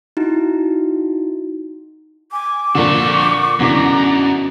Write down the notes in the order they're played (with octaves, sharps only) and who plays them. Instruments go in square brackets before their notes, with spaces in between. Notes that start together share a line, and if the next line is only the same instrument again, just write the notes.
[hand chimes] D#4 E4 F#4
[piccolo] G#5 [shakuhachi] D6
[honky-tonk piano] A#2 D3 [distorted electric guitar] F3 A4 [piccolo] C#6
[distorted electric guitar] F#2 [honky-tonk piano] B2 D3 E3 [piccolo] A#5